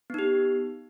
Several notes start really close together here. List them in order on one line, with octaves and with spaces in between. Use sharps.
B3 D#4 G4